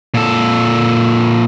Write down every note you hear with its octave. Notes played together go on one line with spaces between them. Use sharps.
A#2 A4